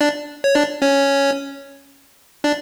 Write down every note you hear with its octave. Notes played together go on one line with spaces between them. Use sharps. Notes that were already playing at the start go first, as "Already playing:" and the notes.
D4 D5
C#5
D4 D5
C#4 C#5
D4 D5